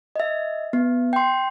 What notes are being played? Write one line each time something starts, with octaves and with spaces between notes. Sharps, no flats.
D#5 E5
B3
G5 C6